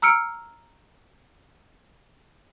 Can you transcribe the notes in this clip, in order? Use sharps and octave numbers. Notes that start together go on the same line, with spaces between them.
A#5 E6 F6 C#7 D7